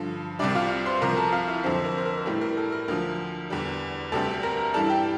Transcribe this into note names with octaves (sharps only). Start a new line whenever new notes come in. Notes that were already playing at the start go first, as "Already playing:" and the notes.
Already playing: G2 D3 F3
C2 C3 G3 D4 D5
F4 F5
C5 C6
C2 C3 F3 A#4 A#5
A4 A5
F4 F5
E4 E5
F2 D3 F3 C4 C5
A#4
C5
A#4
A2 E3 G3 A4
A#4
A4
A#4
D2 D3 F3 A#4
E2 D3 G3
D2 C3 G3 A4 A5
A#4 A#5
G2 E3 G3 A4 A5
G4 G5